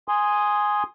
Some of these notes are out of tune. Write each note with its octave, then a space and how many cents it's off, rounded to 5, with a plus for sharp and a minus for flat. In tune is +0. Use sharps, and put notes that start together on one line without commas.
G#5 +0 C6 +0 D#6 +0